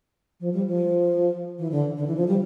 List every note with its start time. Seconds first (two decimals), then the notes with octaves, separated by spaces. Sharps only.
0.40 F3
0.53 G3
0.67 F3
1.59 E3
1.71 D3
1.98 D3
2.08 E3
2.17 F3
2.27 G3